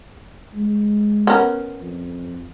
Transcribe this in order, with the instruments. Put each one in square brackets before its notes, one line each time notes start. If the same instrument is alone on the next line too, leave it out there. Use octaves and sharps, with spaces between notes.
[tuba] G#3
[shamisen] B3 C#4 A#4
[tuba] F2